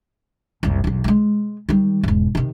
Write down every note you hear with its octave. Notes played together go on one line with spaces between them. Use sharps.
F#1 C2
B1 E2
G3 G#3
D#3 G3
E1 G#2
C3 D#3